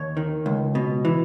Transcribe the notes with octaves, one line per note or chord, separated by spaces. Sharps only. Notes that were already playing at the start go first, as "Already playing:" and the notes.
Already playing: D#2 C#5
D#3
C#2
B2
E3